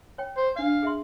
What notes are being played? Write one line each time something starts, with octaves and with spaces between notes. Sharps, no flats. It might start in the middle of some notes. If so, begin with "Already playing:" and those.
C#5 G5
C5
D4 D5 F5
G#4 E5 C6